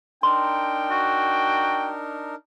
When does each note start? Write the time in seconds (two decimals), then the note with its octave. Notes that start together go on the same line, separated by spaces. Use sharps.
0.23 D4 D#4 A#4 G5 C6
0.91 F#4